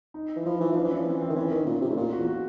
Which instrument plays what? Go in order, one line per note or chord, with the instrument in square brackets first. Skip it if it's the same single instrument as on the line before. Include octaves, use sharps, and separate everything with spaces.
[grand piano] D#4
[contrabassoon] E3
[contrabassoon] F3 [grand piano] E4
[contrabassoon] E3 [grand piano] D#4
[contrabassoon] F3 [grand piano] D4
[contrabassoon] E3
[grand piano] C#4
[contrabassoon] F3
[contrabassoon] E3 [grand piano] C4
[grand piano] C4
[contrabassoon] D#3
[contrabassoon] E3 [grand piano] C#4
[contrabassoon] D#3 [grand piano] C#4
[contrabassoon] A#2 [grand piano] C#4
[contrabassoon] C3 [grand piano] D#4
[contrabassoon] A2
[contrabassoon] A#2 [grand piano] F4
[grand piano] F#4
[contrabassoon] E2
[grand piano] F#4